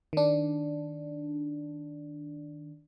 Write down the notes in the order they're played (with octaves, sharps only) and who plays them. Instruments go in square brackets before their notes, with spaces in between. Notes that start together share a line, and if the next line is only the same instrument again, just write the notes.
[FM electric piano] D#3 D4